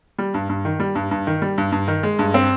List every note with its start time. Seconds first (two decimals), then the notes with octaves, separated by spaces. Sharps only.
0.19 G3
0.34 G2
0.49 G2
0.65 D#3
0.80 G3
0.95 G2
1.11 G2
1.27 D#3
1.42 G3
1.58 G2
1.72 G2
1.88 D#3
2.03 G#3
2.19 G2
2.34 C4